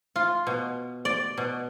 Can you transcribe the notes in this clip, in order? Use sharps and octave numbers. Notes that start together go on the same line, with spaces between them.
F4
B2
D5
B2